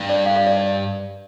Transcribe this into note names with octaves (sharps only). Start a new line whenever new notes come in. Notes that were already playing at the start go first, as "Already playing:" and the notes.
Already playing: G2
D5
F5
F5
D5
D5